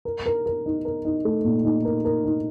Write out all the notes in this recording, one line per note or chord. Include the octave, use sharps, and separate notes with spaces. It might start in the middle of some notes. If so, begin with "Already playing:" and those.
A#4
A#4
A#4
D#4
A#4
D#4
A3
A#2
D#4
A#4
A#4
D#4